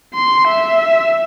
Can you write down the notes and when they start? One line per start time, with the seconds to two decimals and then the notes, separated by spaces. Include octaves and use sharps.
0.14 C6
0.48 E5